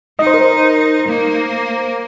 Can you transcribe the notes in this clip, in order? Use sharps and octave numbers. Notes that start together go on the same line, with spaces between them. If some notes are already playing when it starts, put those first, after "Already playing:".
D#4 D#5
C5
A#4
C5
A#3